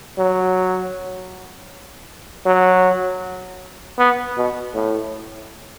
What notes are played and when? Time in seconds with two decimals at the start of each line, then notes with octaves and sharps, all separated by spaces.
0.18 F#3
2.46 F#3
3.99 B3
4.37 B2
4.74 A2